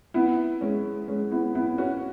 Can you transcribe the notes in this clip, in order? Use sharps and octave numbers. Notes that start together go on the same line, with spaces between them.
B3 E4
G#3 C#4
G#3 C#4
B3 E4
B3 E4
C#4 F#4